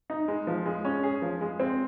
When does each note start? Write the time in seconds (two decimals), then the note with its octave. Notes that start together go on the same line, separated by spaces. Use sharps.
0.10 D#4
0.28 G#3
0.47 F3
0.66 G#3
0.85 C#4
1.03 G#4
1.22 F3
1.41 G#3
1.60 C4